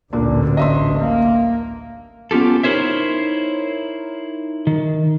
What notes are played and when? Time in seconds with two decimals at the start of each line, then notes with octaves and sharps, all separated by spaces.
0.13 A1 D2 A#2 D3 D4
0.57 D#5 E5 C6
0.97 A#3
2.31 B3 C#4 F4 G4 A4
2.63 D#4 E4 A#4 C5 C#5 E5
4.67 D#3